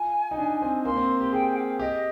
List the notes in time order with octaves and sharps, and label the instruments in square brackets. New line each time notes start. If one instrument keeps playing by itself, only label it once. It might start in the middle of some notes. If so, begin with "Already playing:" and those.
Already playing: [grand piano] F4 [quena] G#5
[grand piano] D#4
D4
C4
[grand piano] A#3 [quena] C6
[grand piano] C4
G4
[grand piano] G#4 [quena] G5
[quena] F5
[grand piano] G4 [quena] D#5